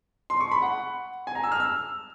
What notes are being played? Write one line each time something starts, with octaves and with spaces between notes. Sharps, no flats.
C6
C#6
B5
F#5
G#5
A#5
E6
F6
E6